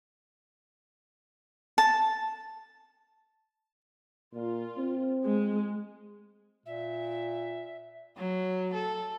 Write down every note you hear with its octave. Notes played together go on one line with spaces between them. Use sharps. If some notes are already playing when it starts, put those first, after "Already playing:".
A5
A#2 F4
C4
G#3
A#2 E5
F#3
A4